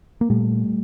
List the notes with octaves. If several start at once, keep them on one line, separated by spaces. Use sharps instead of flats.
A#3
A#2 G3 A3